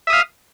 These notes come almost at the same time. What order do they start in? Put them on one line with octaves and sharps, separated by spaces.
E5 D#6 F5